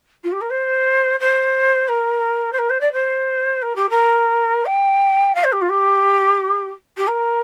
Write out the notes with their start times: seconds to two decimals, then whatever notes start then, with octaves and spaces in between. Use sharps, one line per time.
0.24 F4
0.32 G4
0.41 A#4
0.50 C5
1.20 C5
1.88 A#4
2.52 C5
2.58 A#4
2.70 C5
2.80 D5
2.92 C5
3.62 A#4
3.76 G4
3.90 A#4
4.65 G5
5.35 F5
5.44 C5
5.52 G4
5.61 F4
5.69 G4
6.97 G4
7.08 A#4